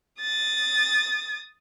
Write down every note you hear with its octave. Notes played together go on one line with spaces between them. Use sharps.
D#6 A6